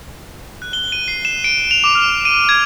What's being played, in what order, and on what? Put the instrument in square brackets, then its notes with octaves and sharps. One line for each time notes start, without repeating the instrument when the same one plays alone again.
[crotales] F#6
G7
D#7
C7
E7
D7
F7
D6
F6
D#7
G#6